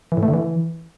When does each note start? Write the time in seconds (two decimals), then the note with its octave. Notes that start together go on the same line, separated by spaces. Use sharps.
0.12 E3
0.17 A2
0.23 A3
0.28 D3
0.34 E3